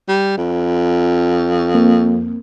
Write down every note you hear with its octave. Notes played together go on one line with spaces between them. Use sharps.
G3
F2
A#3 C4